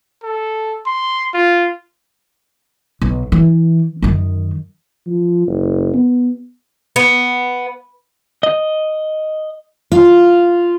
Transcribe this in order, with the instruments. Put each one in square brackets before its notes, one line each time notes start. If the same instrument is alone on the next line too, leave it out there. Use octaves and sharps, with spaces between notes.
[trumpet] A4
C6
F4
[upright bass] B1
E3
F#2 D#3
[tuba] F3
F#1
B3
[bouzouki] B3
[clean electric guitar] D#5
[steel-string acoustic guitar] F4